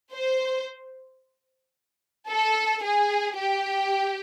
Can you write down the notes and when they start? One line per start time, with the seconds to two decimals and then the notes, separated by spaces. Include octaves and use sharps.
0.14 C5
2.29 A4
2.84 G#4
3.38 G4